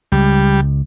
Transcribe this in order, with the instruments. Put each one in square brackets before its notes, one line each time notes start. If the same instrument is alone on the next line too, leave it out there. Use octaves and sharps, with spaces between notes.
[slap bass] C#2 [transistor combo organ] G3